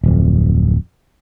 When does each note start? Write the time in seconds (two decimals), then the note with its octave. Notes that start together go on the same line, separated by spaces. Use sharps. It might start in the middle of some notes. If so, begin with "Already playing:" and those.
0.04 D1 F2